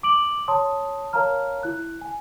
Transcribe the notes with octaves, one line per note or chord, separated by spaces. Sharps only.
D6 D7 F#7
C#5 A5 C6 D#6
A#4 C#5 F5 A5 A#5 F6
E4 F#6
G#5